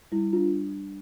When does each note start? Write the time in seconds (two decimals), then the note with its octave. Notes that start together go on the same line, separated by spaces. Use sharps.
0.12 G3 E4
0.33 D4 F4